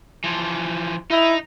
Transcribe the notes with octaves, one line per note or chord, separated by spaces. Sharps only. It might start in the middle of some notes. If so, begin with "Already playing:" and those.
E3 F3
D#4 E4